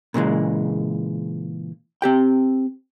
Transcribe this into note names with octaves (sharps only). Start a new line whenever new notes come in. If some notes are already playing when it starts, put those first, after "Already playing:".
A#2 C#3 E3 G#3
C4 G4 G5